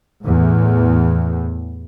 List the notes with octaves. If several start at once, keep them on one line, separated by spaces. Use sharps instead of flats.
E2 A2